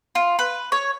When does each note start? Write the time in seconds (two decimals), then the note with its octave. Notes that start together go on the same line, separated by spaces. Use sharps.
0.15 F4
0.39 B4
0.72 C#5